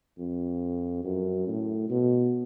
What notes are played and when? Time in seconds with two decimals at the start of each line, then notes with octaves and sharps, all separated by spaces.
0.19 F2
1.04 F#2
1.48 A2
1.90 B2